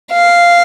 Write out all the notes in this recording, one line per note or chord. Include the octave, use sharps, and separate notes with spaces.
F5